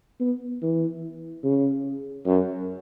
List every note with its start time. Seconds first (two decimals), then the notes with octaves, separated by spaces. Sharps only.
0.20 B3
0.62 E3
1.44 C#3
2.26 F#2